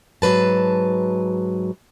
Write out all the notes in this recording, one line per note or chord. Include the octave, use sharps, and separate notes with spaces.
G#2 F#3 B4 A5